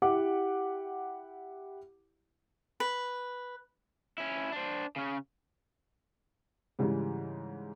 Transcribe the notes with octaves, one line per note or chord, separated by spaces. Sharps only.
E4 G4 F#5 D6
B4
C#4 E4
D4 C5
C#3 C#4
G#2 C#3 E3 G3